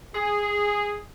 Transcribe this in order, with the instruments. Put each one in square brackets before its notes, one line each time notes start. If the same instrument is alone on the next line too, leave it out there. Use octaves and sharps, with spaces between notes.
[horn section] G#4